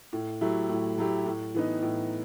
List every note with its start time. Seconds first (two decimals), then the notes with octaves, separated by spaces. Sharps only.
0.13 A2
0.41 F#3 A3 E4 G4
0.69 A2
0.98 F#3 A3 E4 G4
1.26 A2
1.55 E3 B3 D#4
1.82 A2